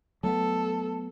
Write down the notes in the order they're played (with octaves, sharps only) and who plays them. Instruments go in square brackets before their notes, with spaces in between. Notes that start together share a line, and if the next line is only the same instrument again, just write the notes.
[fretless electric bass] F#3 A3 B3 [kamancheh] A4